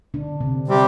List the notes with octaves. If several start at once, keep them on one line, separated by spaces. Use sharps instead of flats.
D3 D4
C3 C4
C3 G3 C4 G4